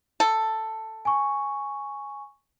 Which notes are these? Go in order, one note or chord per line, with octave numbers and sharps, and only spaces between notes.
A4
G#5 C#6